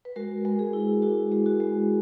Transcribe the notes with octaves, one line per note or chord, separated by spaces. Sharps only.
B4
G#3 F#4 A#4
G#3
G#4
E4
E4 F#4
G#3
F#4
G#3